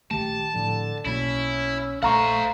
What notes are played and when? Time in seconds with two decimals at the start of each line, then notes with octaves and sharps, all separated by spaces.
0.11 A#1 D#3 A3 G4 A5
0.54 A2 D3 F3
1.05 B1 B2 A#3 C#4 E4
2.03 A#1 A3 C5 F5 F#5 A#5 C#6